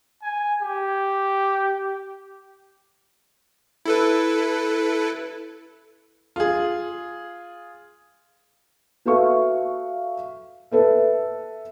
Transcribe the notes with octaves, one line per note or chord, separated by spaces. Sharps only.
G#5
G4
E4 A4 B4
F4 G#4
F#4 A4 B4 E5 F5 C#6
A4 B4 E5